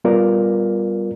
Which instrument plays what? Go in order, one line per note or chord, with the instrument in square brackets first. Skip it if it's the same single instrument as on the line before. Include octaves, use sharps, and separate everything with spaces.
[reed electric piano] G3 B3 F4 A#4 D5